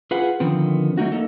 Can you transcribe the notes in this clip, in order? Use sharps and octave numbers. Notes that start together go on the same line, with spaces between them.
F4 G#4 B4 F#5
D3 D#3 F3 B3 C4
F#3 A3 D#4 F#4
A#3 D#4 A4